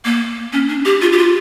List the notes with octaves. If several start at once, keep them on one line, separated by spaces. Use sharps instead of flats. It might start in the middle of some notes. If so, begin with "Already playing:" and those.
A#3
C#4
D4
G4
F4
G4
F4